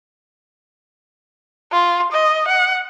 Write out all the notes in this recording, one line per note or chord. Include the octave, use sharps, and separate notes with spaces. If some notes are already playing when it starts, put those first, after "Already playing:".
F4
D#5
F#5